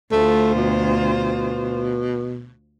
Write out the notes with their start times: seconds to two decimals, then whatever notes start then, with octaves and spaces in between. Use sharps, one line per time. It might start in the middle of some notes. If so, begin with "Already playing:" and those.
0.12 D2 A3 F4 C5
0.55 B2